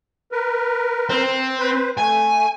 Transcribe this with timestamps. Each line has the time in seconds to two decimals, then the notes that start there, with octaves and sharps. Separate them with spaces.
0.32 A#4 B4
1.10 C4
1.59 B4 C5
1.98 A3 G#5